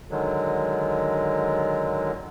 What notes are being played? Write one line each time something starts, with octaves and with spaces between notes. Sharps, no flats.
D3 D#3 F#3 G#3